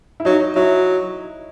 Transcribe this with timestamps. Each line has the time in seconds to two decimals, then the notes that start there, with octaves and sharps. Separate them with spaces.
0.20 E4
0.25 F#3 D#4
0.55 F#3 E4